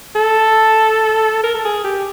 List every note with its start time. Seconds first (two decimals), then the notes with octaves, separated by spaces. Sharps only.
0.15 A4
1.43 A#4
1.55 A4
1.65 G#4
1.84 G4